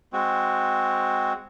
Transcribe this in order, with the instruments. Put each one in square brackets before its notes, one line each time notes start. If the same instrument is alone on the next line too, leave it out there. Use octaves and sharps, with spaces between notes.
[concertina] G#3 C4 F#4